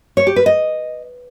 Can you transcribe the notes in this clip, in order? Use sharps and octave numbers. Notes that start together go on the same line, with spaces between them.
C#5
G4
B4
D#5